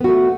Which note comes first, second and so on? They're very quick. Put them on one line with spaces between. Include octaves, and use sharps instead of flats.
B3 F#4 A3